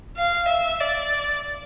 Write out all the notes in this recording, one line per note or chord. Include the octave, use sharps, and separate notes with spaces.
F5
E5
D5